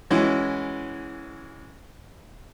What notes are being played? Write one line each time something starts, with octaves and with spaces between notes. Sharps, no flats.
E3 G#3 C#4 E4 F#4